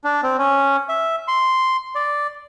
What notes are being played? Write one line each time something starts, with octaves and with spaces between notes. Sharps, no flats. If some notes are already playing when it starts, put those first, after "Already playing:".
D4
C4
C#4
E5
C6
D5